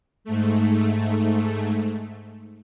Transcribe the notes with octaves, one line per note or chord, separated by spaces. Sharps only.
G#2 A3